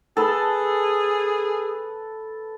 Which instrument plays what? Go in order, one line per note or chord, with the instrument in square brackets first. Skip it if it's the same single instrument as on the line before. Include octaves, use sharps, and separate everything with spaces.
[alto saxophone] G#4 [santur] A4 B4 A5